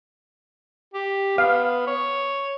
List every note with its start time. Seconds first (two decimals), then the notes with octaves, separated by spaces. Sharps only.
0.94 G4
1.38 B3 F5
1.87 C#5